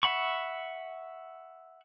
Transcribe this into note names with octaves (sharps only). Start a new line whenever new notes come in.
E5 F#5 B5 C#6